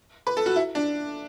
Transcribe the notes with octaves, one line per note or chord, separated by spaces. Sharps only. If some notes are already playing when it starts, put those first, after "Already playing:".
B4
A4
F#4
E4
D4